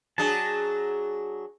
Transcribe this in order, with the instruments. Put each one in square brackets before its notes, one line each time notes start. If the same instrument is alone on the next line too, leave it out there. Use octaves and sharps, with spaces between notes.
[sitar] F#3 D4 G#4 [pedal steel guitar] A5